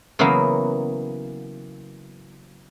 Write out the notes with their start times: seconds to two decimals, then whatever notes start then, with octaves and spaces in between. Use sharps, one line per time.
0.19 C#3 E3 F#3 A#3 B3